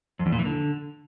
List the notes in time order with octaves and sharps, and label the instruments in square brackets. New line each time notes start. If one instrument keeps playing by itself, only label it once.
[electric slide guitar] F2
E2
A#2
E3
D3